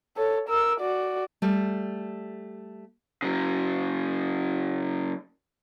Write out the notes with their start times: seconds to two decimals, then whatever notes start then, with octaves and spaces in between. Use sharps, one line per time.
0.17 A4 C#5
0.49 A#4 E6
0.80 F#4 D5
1.42 G3 A3
3.22 C#3 F#3